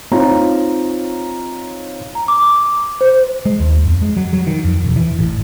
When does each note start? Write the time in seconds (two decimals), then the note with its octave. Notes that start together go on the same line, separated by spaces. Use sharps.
0.12 C4 D#4 F4 C#5 F5 A#5
2.15 A#5
2.28 D6
3.01 C5
3.46 G#3
3.60 D#2
3.86 F2
4.02 G#3
4.17 F#3
4.33 F#3
4.47 D#3
4.65 F2
4.85 E1
4.96 E3
5.19 A1